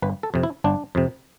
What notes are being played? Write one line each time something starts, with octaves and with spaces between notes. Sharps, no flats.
G1 B4
A4
F2 C3
E4
G1 D4
F2 C3